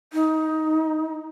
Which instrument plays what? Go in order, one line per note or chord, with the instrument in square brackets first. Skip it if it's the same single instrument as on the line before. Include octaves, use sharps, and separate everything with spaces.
[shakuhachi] D#4